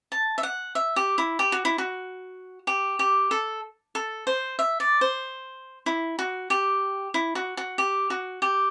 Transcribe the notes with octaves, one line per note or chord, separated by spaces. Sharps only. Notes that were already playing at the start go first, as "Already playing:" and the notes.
A5
E5
F#5
E5
G4
E4
G4
F#4
E4
F#4
G4
G4
A4
A4
C5
E5
D5
C5
E4
F#4
G4
E4
F#4
F#4
G4
F#4
G4